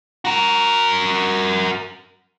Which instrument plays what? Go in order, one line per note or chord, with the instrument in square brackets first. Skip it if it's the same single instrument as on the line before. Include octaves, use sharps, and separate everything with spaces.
[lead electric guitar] F#4 A#4